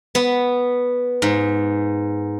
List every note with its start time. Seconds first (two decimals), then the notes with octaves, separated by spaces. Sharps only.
0.15 B3
1.22 G#2